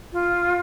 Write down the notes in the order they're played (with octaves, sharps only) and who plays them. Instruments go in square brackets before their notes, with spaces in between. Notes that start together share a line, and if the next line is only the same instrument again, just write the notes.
[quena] F4